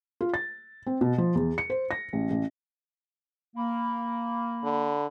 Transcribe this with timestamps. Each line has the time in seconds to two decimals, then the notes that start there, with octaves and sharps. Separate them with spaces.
0.21 F4
0.34 A6
0.87 C4
1.01 B2
1.18 F3
1.35 E2
1.58 C#7
1.70 C5
1.91 A#6
2.13 A1
2.30 A1
3.56 A#3 B5
4.64 D3